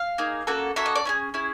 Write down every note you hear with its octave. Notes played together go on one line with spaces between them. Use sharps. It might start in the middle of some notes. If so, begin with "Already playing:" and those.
Already playing: F5
A#3 D#4 G#4
A#3 C#4 F#4 A4
A#3 C#4 F#4 A4 E5
D#5
D5
C#4 E4 G#4
C#4 E4 G#4